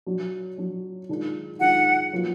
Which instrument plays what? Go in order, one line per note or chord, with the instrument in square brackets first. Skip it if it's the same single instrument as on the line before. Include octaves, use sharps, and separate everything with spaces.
[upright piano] F#3 D4 F#4
F#3 D4 F#4
D#3 G#3 D4 F4
[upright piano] D#3 G#3 D4 F4 [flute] F#5
[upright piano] A#2 F#3 B3 F4